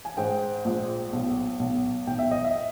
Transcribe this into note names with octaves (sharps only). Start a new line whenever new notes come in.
G#5
G#2 G5
A#1
B1
B1
B1 G5
E5
D#5
E5